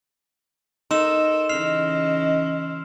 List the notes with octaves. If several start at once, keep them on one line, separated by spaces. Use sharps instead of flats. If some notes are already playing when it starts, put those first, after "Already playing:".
D#4 A4 A#4 C6 E6 E7
C#3 E3 C#4 D#5 F6 C7 F7